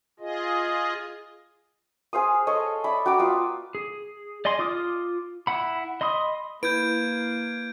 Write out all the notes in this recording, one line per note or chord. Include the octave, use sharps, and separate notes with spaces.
F4 G#4 D#5
G#4 C5 F5 D#6
A4 C#5 D#5
D5 E5 A5 B5
F#4 G5 A#5 D6
B3 F4 D#6
G#4
D5 D#5 G#5 C6
F4 D6 D#6 F6
E4 F#5 B5
D#5 B5 C6 D#6
A#3 E4 B4 G6 G#6 D7